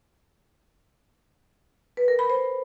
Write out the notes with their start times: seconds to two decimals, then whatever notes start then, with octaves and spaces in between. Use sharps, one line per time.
1.97 B4
2.08 A#4
2.19 B5
2.30 C5